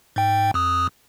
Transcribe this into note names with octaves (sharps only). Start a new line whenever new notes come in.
G#2 G5
F2 D#6